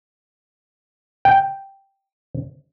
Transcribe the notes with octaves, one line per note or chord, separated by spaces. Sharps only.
G5